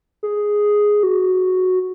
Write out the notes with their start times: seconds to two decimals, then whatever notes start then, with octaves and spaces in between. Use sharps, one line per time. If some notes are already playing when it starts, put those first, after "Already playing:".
0.23 G#4
1.03 F#4